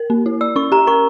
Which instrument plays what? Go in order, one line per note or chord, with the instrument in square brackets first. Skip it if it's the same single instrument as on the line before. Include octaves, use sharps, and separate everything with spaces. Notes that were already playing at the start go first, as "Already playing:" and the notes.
Already playing: [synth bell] A#4
A#3
E4
[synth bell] D5 [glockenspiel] E6
[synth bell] C#4 [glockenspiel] C#6
[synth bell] G4 [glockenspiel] A#5
[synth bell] A#4 [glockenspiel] C#6